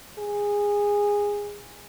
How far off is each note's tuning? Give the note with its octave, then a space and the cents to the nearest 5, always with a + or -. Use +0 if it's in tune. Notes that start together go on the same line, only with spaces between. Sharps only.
G#4 -15